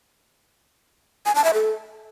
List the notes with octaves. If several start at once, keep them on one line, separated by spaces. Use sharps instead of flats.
G#5
A5
E5
A4